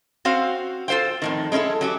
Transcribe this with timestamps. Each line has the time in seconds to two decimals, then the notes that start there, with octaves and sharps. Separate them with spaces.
0.25 C4 C#4 F#4 C5 F5
0.88 F4 A4 C5 F5 G5
1.22 F2 A2 D#3
1.52 G#3 C#4 D#4 E4 A4
1.81 F#3 C#4 G4